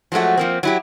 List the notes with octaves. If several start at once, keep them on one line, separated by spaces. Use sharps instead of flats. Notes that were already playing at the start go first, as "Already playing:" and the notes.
F3 F#3 G#3 A3 F#4
F3 A#3 C4
F#3 E4 G4